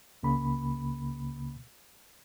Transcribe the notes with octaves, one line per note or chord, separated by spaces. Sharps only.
C#2 C#3 A#3 B5